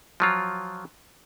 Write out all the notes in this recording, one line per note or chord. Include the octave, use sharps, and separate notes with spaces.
F3 F#3 F4